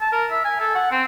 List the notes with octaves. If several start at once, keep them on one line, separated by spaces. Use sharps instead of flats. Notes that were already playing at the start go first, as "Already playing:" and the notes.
A5
A#4
E5
G#5
A4
F#5
C4